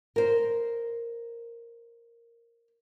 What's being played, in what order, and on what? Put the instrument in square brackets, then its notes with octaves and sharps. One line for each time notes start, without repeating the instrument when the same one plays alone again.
[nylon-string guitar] A#4 C5